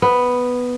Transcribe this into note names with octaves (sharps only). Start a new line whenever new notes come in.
B3